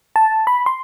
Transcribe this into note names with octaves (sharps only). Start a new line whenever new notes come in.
A5
B5
C6